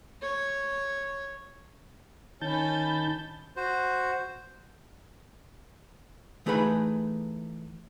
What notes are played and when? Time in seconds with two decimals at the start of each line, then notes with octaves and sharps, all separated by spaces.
0.22 C#5
2.41 D#3 C#4 A5 B5 G6
3.56 F#4 C5
6.46 E3 A3 D#4 G#4 B4 B5